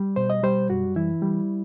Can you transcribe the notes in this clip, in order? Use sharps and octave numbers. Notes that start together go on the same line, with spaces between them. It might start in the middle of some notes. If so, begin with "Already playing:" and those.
Already playing: G3
B2 C5
D#5
G3 C5
F#2 F#4
E3 E4
G3